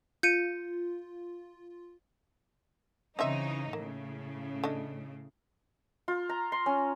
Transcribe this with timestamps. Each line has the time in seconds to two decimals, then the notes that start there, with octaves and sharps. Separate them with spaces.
0.23 F4 G6 C#7 D#7
3.19 C#3 E3 C4 D#4 D#5 E5
3.73 A2 C#3 A#3
4.64 A3 D4 D#5
6.08 F4
6.29 A#5
6.52 C6
6.66 C#4